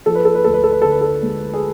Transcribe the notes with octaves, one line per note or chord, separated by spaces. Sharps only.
F3 A4
B4
A4
B4
D2 A4
B4
A4
B4
D3 A4
B4
A4
G#3
G#4